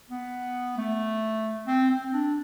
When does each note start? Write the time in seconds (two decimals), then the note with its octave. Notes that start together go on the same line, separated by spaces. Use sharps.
0.10 B3
0.77 A3
1.67 C4
1.91 C4
2.13 D4